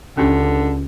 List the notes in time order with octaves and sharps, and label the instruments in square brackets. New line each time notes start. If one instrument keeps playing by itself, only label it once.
[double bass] C#2 [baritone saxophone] D3 [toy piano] C#4 D4 G4